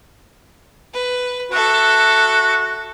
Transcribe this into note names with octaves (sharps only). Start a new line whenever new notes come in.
B4
F#4 A4 E5